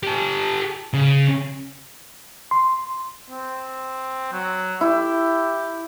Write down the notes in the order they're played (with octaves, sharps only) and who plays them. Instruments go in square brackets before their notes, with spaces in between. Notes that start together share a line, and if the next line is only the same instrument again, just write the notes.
[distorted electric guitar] G4 A4
C#3
[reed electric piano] C6
[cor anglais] C4
F#3
[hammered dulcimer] E4 [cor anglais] G4